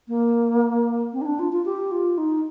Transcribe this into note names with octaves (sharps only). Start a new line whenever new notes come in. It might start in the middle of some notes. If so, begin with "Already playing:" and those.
A#3
C4
D#4
D4
F4
F4
G4
F4
D#4